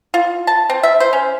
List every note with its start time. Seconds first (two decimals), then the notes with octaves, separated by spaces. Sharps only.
0.14 F4
0.47 A5
0.70 C4
0.83 E5
1.00 C5
1.13 C#4